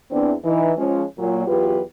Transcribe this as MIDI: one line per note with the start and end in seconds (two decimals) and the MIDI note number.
0.11 0.33 40
0.11 0.33 60
0.11 0.33 62
0.44 0.71 52
0.44 0.71 63
0.77 1.03 53
0.77 1.03 56
0.77 1.03 61
1.18 1.45 46
1.18 1.45 54
1.47 1.80 40
1.47 1.80 54
1.47 1.80 65
1.47 1.80 67
1.47 1.80 71